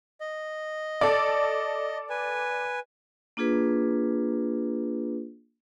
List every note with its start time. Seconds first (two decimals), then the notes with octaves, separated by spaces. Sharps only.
0.21 D#5
1.01 A4 D5
2.10 B4 G#5
3.37 A#3 D4 F4 G#4 B4